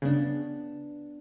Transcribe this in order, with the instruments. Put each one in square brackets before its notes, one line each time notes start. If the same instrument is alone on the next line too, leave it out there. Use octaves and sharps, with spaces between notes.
[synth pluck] C#3 [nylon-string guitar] B3 D4